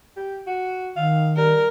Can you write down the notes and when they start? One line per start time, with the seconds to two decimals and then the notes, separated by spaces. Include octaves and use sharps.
0.16 G4
0.47 F#4
0.96 D#3 F5
1.37 G3 A#4